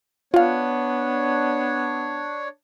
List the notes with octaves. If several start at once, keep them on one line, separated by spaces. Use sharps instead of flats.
B3 D4 F4 C#5 F5